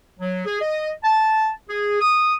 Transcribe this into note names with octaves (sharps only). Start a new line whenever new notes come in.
F#3
G#4
D#5
A5
G#4
D#6